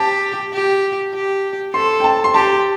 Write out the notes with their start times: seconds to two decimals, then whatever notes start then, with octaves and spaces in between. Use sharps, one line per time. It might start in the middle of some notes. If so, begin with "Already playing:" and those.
Already playing: G4 A5
0.53 G4
1.14 G4
1.74 A4 C6
2.00 G5
2.04 A5
2.24 C6
2.34 G4 A5